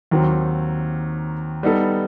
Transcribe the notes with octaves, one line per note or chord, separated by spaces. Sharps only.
D#2 D#3 F#3 C4
G3 B3 D#4 A4